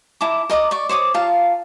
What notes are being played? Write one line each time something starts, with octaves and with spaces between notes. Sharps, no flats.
E4 A5 A#5 D6
A#4 D#5 A#5 D6
D5 C#6
C5 C#5 D6 D#6
F4 A#4 F5 A5